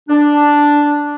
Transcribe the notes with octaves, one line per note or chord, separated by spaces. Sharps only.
D4